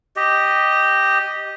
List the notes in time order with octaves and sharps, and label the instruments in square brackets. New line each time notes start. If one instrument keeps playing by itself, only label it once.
[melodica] G4 D#5